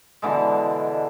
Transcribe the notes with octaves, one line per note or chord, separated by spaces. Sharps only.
B2 D3 E3 G#3